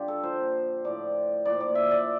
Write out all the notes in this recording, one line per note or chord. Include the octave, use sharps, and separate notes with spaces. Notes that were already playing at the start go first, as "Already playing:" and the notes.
Already playing: G2 D3 F4 G4
A4
A#2 F3 C5
A2 F3 D5
A#2 F3 D5
D5
E5
D5